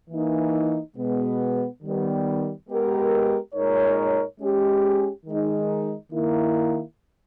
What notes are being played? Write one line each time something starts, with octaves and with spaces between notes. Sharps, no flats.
E3 A#3 D#4
B2 G#3 B3
D#3 G3 B3
G#3 B3 G4 A#4
A#2 G#3 D#4 A#4 C#5
G#3 C#4 G4
D#3 G#3 D#4
D#3 A#3 E4